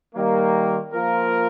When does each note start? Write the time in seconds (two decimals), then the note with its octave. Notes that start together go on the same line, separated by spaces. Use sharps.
0.15 D#3 G3 A#3
0.93 F3 A#3 F4 A#4